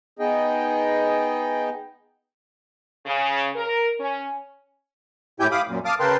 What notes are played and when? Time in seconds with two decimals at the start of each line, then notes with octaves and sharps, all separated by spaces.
0.19 B3 D#4 G#4 D#5 G5
3.06 C#3
3.55 A#4
4.00 C#4
5.40 A2 E4 G4 G5 G#5 G6
5.51 F5 B5 D6 D#6
5.67 F#2 A#2
5.85 F5 A5 D6 D#6 F6
6.00 C#3 A#4 B4 G5 A5 C6